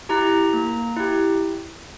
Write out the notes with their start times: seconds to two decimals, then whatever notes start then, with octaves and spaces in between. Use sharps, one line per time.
0.09 E4 G4 A#5
0.53 A#3
0.97 E4 G4